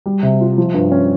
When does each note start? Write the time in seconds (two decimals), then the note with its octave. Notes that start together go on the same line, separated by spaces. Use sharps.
0.06 G3
0.23 C3
0.41 F4
0.58 F3
0.74 G2
0.92 C#4